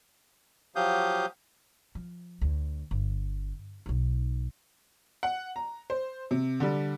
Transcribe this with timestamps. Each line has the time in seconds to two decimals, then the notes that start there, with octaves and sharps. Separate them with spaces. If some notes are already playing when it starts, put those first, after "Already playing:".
0.76 F3 F#3 G4 F5 D#6 G6
1.95 F3
2.41 D2
2.91 G1
3.86 B1 D#4
5.23 F#5
5.56 A#5
5.90 C5
6.31 C3
6.60 D3 G3